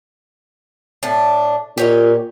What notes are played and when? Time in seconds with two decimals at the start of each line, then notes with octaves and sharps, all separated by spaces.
1.03 A2 D4
1.78 A#2 G4 C#5 D#5